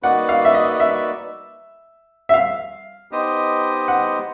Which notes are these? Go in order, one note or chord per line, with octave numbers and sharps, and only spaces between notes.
A#3 D#4 F#4 B4 D5 F#5
F5
E5
D#5
E5
E5
F5
B3 D#4 G4 C5 D#5
F#5